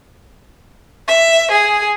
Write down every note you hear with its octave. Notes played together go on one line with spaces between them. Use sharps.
E5
G#4